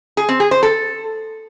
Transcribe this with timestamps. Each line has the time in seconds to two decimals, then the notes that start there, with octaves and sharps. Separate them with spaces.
0.17 G#4
0.29 C4
0.40 G#4
0.51 C5
0.63 A4